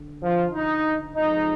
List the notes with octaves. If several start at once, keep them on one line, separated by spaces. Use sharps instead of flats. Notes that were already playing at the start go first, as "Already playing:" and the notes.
Already playing: D3
F3 F4
D#4
F2 F3 G#3 D#4